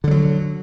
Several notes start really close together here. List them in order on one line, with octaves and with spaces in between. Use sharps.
D3 G3 F#3